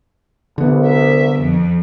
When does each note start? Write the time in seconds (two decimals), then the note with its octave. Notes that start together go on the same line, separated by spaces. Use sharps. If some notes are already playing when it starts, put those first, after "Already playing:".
0.58 C2 D3 B3
0.87 E5
1.39 F2